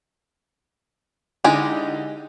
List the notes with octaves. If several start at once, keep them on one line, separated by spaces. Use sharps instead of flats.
D3 G#3 D#4 E4 G4 G#5